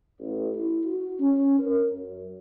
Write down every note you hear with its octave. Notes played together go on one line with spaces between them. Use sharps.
A1
E4
F#4
C#4
A#4
F#2